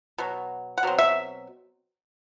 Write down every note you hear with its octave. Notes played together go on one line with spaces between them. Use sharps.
B2 F#3
F#5
B2 F#3 C4
E5